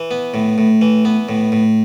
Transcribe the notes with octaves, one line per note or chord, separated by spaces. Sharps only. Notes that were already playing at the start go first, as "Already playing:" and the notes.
Already playing: E3
B3
A2
A2
E3
B3
A2
A2